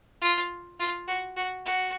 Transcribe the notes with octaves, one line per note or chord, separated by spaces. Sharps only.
F4
F4
F#4
F#4
F#4